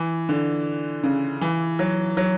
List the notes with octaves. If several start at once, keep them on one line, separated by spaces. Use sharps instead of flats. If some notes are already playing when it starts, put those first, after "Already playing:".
Already playing: E3
D3
C#3
E3
F#3
F#3